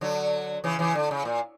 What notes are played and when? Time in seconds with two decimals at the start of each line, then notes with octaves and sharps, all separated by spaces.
0.01 D3 F#3
0.64 C#3 E3
0.79 C#3 E3
0.95 D3
1.11 C#3
1.25 A#2